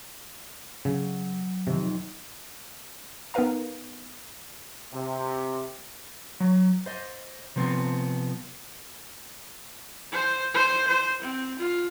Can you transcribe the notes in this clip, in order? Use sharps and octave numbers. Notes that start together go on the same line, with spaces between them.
C#3 F#3
F2 C3 D#3
B3 D#4 A#4 B4 F5 A#5
C3
F#3
C5 D#5
C3 F3 B3 C4
C5
C5
C5
C4
F4